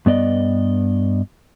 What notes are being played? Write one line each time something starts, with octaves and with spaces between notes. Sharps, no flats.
G2 B3 D5 D#5